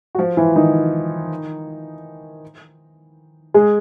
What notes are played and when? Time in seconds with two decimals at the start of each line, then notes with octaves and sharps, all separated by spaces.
0.15 F#4
0.18 F3 F4
0.37 E3 E4
0.56 D#3 D#4
3.54 G#3 G#4